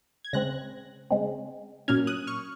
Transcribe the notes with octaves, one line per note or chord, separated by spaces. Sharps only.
G#6
C#3 G#3 C4 F#6 A#6
C#3 G#3 C4
A#2 F#3 A#3 C#4 F6 G#6
D#6 F#6
C#6 F6